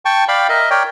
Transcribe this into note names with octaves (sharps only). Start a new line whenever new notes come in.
G5 A5 C#6
D5 F5 G5 B5
A#4 D#5 E5
A#4 C#5 D5 G5